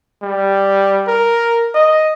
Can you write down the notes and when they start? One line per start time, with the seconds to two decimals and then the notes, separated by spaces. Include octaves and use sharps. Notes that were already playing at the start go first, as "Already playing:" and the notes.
0.22 G3
1.07 A#4
1.74 D#5